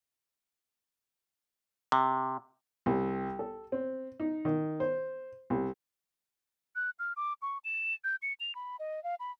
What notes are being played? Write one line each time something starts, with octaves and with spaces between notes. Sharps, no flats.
C3
C2
A4
C4
D#4
D#3
C5
C2
F#6
F6
D6
C#6
E7
G6
C#7
F7
B5
D#5
F5
B5